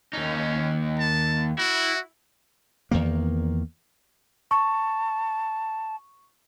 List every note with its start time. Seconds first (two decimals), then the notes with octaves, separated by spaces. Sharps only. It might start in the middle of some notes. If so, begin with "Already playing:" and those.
0.13 D#2 C#4 D#4
0.99 A5
1.58 E4 F#4
2.91 E2 D#3 A#3
4.51 A5 C#6